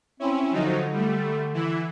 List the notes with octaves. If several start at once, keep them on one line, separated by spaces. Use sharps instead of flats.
C4 C#4 E4
D3 F3 F#3 D#4
G3 A3
E3 E4